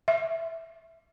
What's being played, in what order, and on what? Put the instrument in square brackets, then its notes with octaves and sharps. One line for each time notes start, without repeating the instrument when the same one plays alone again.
[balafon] E5